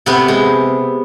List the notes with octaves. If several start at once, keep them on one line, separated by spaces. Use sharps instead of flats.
C3 B3
G#3